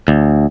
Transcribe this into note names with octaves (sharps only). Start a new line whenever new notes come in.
D2